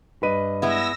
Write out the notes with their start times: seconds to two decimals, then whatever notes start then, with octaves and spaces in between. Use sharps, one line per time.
0.23 G2 B4 D#5 D#7
0.62 G#3 B3 E4 E6 A#6